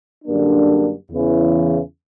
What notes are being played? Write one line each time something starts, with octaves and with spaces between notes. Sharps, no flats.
F#2 D3 G3 A#3 D4
E2 C#3 E3